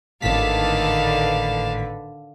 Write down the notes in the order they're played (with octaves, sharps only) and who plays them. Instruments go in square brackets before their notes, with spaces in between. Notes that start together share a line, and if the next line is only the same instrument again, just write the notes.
[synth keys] G#1 A2 B6 [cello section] D3 B4 [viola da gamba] D#3 [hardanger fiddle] F5 A5